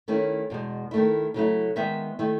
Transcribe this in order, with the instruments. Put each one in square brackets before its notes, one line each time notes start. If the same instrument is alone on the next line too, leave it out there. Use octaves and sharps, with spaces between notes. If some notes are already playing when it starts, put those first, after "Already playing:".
[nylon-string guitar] D#3 A3 C#4 E4
E2 B2 G#3
D#3 A3 E4
C#3 F#3 A3 E4
D#3 G#3 B3 D#4 E5
D#3 A3 E4